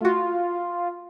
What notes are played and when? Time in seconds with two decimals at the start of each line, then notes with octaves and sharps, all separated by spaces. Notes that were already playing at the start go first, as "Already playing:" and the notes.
0.01 A3 F4 F#4